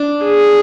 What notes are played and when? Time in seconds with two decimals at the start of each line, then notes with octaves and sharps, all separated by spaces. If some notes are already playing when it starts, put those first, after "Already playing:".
Already playing: D4
0.25 G#4